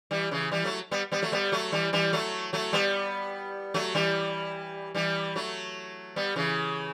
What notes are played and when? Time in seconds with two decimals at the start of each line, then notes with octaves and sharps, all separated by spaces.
0.11 E3 G3
0.31 C#3 E3
0.51 E3 G3
0.64 F#3 A3
0.91 G3 B3
1.12 G3 B3
1.22 F#3 A3
1.32 G3 B3
1.52 F#3 A3
1.72 E3 G3
1.93 E3 G3
2.13 F#3 A3
2.53 F#3 A3
2.73 G3 B3
3.74 F#3 A3
3.95 E3 G3
4.95 E3 G3
5.36 F#3 A3
6.16 G3 B3
6.36 C#3 E3